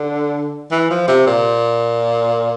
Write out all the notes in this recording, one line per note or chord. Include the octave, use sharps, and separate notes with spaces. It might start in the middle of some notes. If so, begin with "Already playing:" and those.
Already playing: D3
E3
F3
C3
A#2